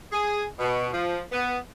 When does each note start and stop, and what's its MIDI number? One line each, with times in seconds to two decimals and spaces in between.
0.13 0.44 68
0.59 0.88 47
0.93 1.19 53
1.32 1.56 59